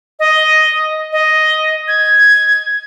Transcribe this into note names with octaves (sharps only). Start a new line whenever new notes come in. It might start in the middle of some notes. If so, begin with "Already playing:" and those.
D#5
D#5
G#6